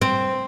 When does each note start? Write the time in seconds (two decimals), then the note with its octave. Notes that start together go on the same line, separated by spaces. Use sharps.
0.02 C4